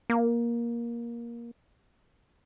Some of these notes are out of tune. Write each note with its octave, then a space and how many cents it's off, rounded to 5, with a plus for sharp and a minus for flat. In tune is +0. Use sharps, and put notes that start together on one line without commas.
A#3 +15